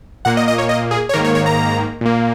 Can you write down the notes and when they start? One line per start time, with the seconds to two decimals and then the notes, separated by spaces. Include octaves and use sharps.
0.25 A#2 A#3 F#5
0.37 D#5
0.48 D#5
0.58 C#5
0.69 D#5
0.91 G#4
1.09 C#5
1.14 G#2 D#3 A#3 A#4
1.24 C#5
1.35 C#5
1.46 A#5
2.01 A#2 A#3